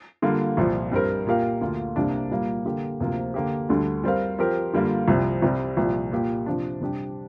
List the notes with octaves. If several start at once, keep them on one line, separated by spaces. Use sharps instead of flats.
D3 G3 A#3 F4
C2 A#2 F3
G2 G3 C4 A#4
A#2 A#3 G4 A#4 F5
D2 D3 A#3 F4
C2 C3 A#3 D4
A#2 G3 A#3
D3 A#3 G4
D2 C3 F3 A#3
D3 A#3 G4
D2 D3 G3 D4
G3 C4 A#4 F5
F3 C4 G4 A#4
D3 G3 A#3 F4
C2 C3 F3
C2 C3 G3
C2 A#2 F3
A#2 A#3 G4
C3 F3 D4
C3 G3 D4 G4